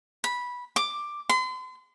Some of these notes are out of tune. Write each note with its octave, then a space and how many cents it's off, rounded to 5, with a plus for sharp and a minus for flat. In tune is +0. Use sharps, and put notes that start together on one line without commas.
B5 -10
D6 +10
C6 -40